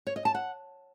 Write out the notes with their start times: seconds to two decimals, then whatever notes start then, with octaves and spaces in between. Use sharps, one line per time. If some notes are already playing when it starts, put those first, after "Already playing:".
0.07 C#5
0.16 D#5
0.25 A5
0.35 F#5